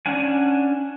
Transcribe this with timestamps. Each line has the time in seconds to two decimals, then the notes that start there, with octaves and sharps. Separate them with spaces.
0.06 C#4 D4 F#5 G#5